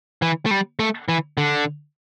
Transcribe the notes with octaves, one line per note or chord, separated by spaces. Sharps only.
E3
A3
G3
A3
E3
D3